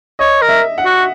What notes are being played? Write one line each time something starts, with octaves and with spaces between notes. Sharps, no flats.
C#5 D#5
A#4
E5
F#5
F#4